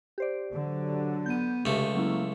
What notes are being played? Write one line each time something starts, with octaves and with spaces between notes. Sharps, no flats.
G4 C5 D5
D3 F#3
B3 G6 D#7
C#2 C3 A3
F#3 A#3 C#4 E4